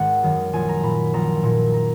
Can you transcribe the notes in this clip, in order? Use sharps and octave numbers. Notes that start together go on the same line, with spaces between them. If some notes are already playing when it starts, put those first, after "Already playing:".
Already playing: G#1 F#5
F#2 D#3
A#1 G#5
A#5
A#2 B5
A#1 A#5
A#2
A#5